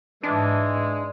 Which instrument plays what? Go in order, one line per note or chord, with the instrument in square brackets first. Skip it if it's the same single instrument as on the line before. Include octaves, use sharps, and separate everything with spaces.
[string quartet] G#2 E3 [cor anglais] G#3 [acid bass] D4